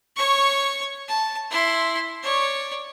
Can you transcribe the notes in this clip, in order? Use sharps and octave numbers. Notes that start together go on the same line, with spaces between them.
C#5 C#6
A5
E4 C6
C#5 D5